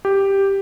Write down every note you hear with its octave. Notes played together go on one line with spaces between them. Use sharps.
G4